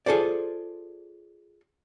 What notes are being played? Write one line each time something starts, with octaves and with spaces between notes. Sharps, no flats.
F4 G#4 A4 C5 D5